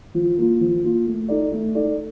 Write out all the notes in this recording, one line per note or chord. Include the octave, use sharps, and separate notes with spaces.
F3
A#3 F4
F3
A#3 F4
A3
D#4 A4 D5
A3
D#4 A4 D5